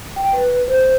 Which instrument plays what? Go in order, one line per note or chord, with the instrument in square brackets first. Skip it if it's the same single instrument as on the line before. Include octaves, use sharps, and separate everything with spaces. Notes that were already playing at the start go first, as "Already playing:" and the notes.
[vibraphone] G5
B4
C5